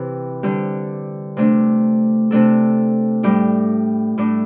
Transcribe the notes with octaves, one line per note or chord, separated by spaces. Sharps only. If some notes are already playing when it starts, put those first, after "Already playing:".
Already playing: C3 E3 C4 E4 G4
D3 G3 D4 G4
C3 A3 D4
C3 A3 D4 A4
A2 G3 D4 G4
A2 A3 D4